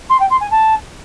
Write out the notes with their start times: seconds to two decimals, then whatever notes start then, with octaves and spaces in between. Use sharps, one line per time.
0.09 C6
0.20 G5
0.30 C6
0.40 G#5
0.51 A5